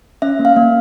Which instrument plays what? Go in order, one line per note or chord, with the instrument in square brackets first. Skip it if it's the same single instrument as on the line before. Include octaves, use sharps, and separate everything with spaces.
[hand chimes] C#4 E5
A#3
F5
A#3